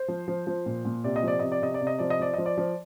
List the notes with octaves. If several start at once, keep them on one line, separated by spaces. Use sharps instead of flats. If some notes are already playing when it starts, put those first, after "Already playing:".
Already playing: C5
F3
F3
F3
A#2
A#2
C3 D5
D#5
F3 D5
C3 D#5
D5
C3 D#5
D5
C3
D#5
F3 D5
D#5
F3 D5
F3 D#5
D5
F3